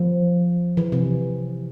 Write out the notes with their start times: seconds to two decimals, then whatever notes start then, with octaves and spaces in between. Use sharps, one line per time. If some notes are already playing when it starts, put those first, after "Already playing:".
Already playing: F3
0.77 E3
0.92 C3